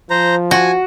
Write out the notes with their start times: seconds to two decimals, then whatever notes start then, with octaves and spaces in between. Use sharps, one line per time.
0.10 F3 C5 A#5
0.51 F#4 G#5